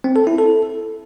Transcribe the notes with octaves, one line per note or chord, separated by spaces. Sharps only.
C4
A4
E4
A4